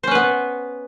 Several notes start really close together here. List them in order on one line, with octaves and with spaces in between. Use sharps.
C5 C#4 B4 B3